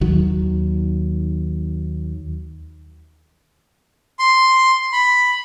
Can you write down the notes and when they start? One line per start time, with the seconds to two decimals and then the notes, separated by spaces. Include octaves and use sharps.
0.01 D#2 D#3 F#3
4.19 C6
4.93 B5